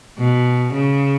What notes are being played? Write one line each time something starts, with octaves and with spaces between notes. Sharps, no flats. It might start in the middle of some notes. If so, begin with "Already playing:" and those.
B2
C#3